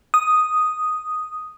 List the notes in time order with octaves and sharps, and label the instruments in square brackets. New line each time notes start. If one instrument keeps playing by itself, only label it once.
[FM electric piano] D#6